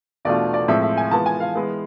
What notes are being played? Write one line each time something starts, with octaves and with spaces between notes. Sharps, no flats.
E2 B2 A3 D4 F4 D5
D5
A2 F3 G#3 C4 E5
E5
G#5
E3 G#3 B3 F4 A5
G#5
F5
E3 G#3 B3